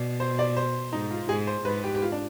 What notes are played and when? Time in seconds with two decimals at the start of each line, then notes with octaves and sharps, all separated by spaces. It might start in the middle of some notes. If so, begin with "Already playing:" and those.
Already playing: B2 D5
0.20 C5
0.39 D5
0.57 C5
0.93 G#2 D#4
1.11 F4
1.29 G#2 G#4
1.47 C5
1.65 G#2 B4
1.84 G4
1.95 G4
2.02 F4
2.12 D4